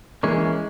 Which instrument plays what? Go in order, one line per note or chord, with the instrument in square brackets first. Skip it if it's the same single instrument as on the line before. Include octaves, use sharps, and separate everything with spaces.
[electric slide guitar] E3 A#3 C#4 [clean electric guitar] G#3